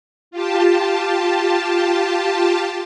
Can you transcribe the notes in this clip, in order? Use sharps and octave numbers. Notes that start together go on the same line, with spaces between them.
F4 G4 A5